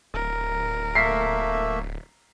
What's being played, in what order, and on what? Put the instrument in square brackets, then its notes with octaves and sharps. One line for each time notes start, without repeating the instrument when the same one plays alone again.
[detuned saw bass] D1 [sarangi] A#4
[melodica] A3 A#3 E5 [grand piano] B6 C7